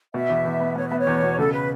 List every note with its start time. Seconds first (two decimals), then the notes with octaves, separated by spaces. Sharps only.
0.14 B2 E5
0.30 E2
0.45 E2
0.60 B3
0.76 B3 C#5
0.88 B3 E5
0.99 C#5
1.07 E2
1.22 B2
1.39 C#3 A4
1.53 B4